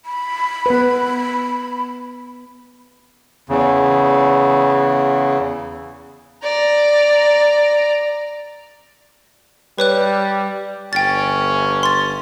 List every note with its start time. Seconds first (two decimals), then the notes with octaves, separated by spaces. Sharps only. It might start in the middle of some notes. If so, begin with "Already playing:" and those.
0.05 B5
0.66 B3 B4
3.49 E2 C#3
6.43 D5 A#5
9.78 G3 B4 C#5 F#6
10.93 G1 C#4 G5 A6
11.83 C6 A6